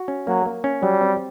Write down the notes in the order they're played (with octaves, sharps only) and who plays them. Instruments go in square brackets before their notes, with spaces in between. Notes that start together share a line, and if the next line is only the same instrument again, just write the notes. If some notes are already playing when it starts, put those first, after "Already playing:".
Already playing: [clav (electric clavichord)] F#4
C#4
[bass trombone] F#3 [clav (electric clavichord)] A#3
[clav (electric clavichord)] A#3
C#4
[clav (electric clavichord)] F#3 [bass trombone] G3
[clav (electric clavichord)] C4